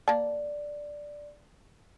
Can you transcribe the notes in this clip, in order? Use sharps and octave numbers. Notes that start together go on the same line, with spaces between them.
A#3 D5 A5